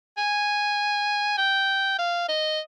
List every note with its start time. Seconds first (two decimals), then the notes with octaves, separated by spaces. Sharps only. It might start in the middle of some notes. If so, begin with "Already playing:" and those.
0.18 G#5
1.37 G5
1.98 F5
2.29 D#5